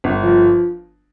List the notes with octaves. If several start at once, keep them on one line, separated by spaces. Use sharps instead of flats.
G1
F3